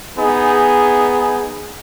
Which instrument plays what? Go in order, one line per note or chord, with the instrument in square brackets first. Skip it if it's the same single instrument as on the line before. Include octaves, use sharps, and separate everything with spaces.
[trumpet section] B3 D#4 G#4